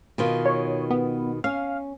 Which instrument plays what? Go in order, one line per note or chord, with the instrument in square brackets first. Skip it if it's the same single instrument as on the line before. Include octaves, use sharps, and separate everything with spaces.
[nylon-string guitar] B2 D#3 F4
[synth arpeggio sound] C#5
B3
[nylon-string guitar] C#4 [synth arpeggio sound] F5